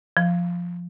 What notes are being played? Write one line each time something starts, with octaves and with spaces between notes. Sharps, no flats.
F3